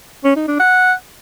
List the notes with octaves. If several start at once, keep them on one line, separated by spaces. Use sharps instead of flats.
C#4
D#4
D4
F#5